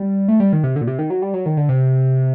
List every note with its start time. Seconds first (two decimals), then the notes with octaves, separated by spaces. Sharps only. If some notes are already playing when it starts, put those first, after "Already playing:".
Already playing: G3
0.28 A3
0.40 G3
0.53 D#3
0.64 C3
0.76 D3
0.81 A#2
0.87 C3
0.99 D#3
1.10 F#3
1.22 G3
1.34 F#3
1.46 D#3
1.57 D3
1.69 C3